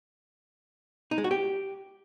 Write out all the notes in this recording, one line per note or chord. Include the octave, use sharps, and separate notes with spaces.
D#4
G#3
F#4
G4